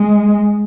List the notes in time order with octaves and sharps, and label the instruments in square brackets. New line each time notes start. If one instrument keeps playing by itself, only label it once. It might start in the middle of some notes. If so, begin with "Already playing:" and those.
Already playing: [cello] G#3